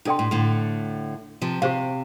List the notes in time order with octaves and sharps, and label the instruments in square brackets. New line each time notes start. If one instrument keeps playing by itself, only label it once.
[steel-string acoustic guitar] C3 [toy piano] D4 A4 D5 G5 C6
[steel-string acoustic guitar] A2
A2 D3
C3 F3
[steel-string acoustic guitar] C3 [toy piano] G4 C5 F5